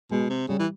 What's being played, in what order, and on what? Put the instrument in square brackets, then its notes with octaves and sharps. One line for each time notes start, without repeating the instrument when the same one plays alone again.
[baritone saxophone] B2 [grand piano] G#3
[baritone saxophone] C3
[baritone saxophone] C#3 [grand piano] G3
[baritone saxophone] E3